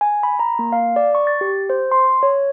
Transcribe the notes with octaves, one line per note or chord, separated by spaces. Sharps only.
G#5
B5
A#5
A#3
F5
D5
C#6
A6
G4
C5
C6
C#5